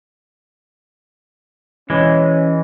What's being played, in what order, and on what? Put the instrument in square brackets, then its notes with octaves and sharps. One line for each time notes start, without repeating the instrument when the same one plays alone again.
[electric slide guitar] E3 G#3 [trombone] C#4